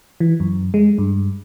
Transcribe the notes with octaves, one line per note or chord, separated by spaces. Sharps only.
E3
F#2
G#3
G2